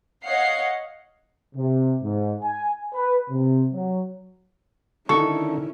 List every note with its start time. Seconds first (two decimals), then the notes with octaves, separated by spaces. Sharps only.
0.24 C#5 D#5 F5 F#5 C7
1.55 C3
2.03 G#2
2.42 G#5
2.93 B4
3.30 C3
3.72 F#3
5.09 D3 D#3 C#4 D#4 E4 A4 C#6